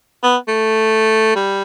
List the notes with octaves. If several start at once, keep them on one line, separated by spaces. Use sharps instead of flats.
B3
A3
G3